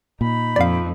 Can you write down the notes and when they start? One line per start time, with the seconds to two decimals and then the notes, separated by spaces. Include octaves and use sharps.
0.21 A#2 D#4 B5
0.56 F2 D5 F5